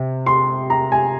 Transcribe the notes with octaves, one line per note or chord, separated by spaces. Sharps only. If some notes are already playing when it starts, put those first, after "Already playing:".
Already playing: C3
C6
A#5
G#5